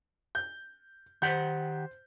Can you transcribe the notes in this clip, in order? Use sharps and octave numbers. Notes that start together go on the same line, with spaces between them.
G6
D#3 G4 C5 F#5 G6